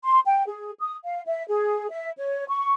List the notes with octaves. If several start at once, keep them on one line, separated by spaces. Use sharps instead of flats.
C6
G5
G#4
D#6
F5
E5
G#4
E5
C#5
C#6